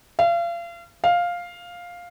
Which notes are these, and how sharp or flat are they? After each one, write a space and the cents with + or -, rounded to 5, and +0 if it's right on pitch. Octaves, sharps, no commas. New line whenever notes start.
F5 -35
F5 +5